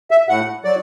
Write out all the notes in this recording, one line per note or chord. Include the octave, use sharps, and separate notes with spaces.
E5
A2 F#5
F#3 D5